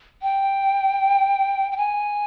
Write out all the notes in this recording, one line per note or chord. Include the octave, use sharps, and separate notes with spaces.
G5
G5
G#5